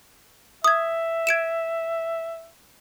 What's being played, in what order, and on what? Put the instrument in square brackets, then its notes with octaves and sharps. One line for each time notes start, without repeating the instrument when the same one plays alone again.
[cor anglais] E5 [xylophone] D#6 G#6
[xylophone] G#6 D7 E7